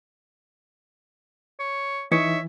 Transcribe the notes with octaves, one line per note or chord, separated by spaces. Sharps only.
C#5
E3 D#4 C#5 E5